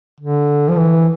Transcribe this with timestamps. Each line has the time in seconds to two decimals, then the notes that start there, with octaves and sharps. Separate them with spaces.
0.20 D3
0.69 F3
0.77 E3